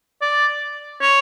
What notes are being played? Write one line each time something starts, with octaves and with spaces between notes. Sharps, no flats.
D5
C#5